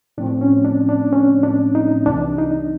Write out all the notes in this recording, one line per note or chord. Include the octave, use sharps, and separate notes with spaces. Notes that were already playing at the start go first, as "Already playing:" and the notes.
A2 F3 A3 C4 D4
C#4
D4
D4
C#4
D4
D#4
C2 C3 E3 D4
D#4